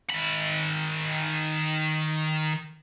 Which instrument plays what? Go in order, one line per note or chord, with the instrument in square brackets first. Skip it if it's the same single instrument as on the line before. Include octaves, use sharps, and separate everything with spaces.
[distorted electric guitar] D#3 B5